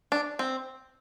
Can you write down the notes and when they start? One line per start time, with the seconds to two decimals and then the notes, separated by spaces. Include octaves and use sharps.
0.12 D4
0.39 C4